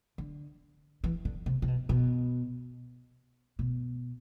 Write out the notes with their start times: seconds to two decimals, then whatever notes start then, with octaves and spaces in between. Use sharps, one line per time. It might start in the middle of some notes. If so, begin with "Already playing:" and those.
0.18 D3
1.04 E3
1.25 D3
1.46 C3
1.62 C3
1.68 B2
1.89 B2
3.59 B2